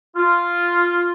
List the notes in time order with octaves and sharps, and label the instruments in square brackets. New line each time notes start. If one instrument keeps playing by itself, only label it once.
[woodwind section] F4